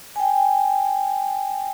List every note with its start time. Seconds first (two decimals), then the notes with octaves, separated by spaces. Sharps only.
0.16 G5 G#5